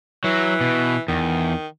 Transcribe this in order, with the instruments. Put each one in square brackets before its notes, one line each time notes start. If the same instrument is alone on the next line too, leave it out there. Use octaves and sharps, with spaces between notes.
[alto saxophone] E3 [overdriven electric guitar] F#3
[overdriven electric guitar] B2
[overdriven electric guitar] E2 [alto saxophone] D#3